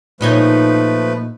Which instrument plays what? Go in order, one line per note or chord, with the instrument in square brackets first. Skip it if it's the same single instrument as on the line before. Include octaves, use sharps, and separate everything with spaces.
[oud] A#2 D#4 C#5 [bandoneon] F3 A3 B4